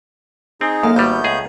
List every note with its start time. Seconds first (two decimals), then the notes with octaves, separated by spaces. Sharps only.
0.61 C4 D#4 G#4
0.83 F#2 A#3 A4 F5
0.96 G#1 G3 A3 B3 A#5 G6
1.24 C#2 G#4